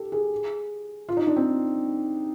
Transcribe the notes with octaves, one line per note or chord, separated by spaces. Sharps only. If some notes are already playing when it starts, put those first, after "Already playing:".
Already playing: G4 A4
G#4
F4
D#4
D4
C4